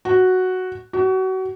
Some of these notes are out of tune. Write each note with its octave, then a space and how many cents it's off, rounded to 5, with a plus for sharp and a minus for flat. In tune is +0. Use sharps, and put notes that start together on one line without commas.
F#4 +0
F#4 +30